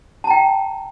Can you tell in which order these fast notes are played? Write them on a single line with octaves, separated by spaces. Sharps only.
A5 A#5 G5